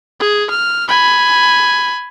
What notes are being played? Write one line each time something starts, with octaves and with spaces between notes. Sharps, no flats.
G#4
F6
G#5 B5